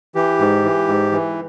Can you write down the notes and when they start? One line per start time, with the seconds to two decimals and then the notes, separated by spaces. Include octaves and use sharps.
0.15 E3 G4
0.39 G#2
0.64 E3
0.88 G#2
1.12 E3